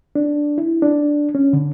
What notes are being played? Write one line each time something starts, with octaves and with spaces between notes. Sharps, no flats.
D4
E4
D4
C#4
D3